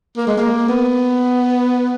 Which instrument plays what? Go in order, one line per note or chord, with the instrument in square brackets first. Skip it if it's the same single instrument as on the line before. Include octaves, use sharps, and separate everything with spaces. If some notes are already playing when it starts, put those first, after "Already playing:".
[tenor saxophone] A#3
G#3
A#3
B3